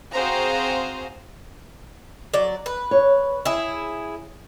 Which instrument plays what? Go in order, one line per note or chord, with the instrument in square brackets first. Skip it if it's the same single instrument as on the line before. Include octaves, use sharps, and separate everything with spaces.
[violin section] C4 F#4 G#4 C5 F5 A#5
[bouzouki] F#3 D5
B4
[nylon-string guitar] C#5
[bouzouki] E4 G#4